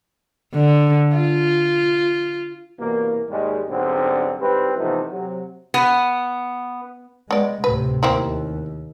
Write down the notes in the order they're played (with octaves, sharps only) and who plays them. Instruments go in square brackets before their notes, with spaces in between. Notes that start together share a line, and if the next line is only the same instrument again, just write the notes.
[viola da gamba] D3
F4
[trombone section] C2 B2 E3 A#3
D#2 G#2 G3 G#3
B1 G#2 D3 G3 C4
G#1 G3 C4 E4 B4
C3 E3 F3 A3 B3 D#4
C3 F#3
[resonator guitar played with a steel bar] B3
[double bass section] G#3 [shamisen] B3 D5
[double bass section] D2 A2 C3 [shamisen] B4
[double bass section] D#2 [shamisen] A#3 C4 E4